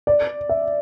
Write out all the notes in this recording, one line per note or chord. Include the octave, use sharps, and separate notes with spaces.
D5
E5